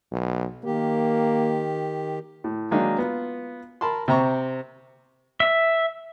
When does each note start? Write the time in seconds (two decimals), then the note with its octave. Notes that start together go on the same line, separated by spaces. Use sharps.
0.11 B1
0.64 D#3 A#3 G4
2.44 A2
2.71 D#3 F#3 G#3 A#3 D4 D#4
2.98 B3 F4
3.81 A#4 A5 B5 C6
4.08 C3 C4 A#5 C#6
5.40 E5